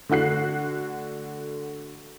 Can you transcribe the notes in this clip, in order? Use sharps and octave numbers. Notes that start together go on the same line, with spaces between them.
D3 A3 F#4 F#6 C7